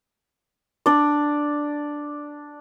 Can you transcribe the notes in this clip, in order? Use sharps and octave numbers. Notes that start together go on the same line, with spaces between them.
D4 D5